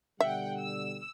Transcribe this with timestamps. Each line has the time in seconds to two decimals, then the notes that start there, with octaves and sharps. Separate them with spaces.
0.20 B2 D3 G3 E5 F#5 G5
0.59 E6